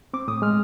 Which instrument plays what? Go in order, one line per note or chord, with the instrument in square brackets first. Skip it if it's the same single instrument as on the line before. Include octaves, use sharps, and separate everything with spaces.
[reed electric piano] C4 D6
A2 D#6
G#3 F6